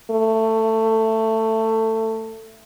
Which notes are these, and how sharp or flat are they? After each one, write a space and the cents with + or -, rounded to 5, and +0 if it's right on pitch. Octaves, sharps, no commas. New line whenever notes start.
A3 +15